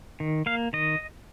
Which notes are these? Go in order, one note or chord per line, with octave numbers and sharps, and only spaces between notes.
D#3
A#3 F5
D#3 D#5